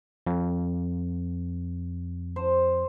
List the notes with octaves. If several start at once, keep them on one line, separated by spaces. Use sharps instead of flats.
F2
C5